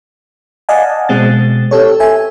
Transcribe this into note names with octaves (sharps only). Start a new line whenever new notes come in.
D5 D#5 F5 F#5 G#5 A5
B2 G#3 C4 A6
C4 G4 A4 C#5
A4 E5 G#5